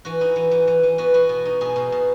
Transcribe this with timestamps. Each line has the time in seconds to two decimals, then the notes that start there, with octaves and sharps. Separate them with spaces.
0.05 E3 F#4
0.21 D#4 E4
0.36 E3
0.51 E3
0.68 E3
0.83 E3
0.98 B3 F#4
1.14 B3 F#4
1.29 B2
1.45 D#4
1.61 B2 G#4
1.76 B2
1.92 B2